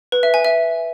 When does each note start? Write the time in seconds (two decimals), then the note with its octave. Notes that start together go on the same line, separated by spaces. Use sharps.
0.12 B4
0.23 E5
0.34 G#5
0.45 E5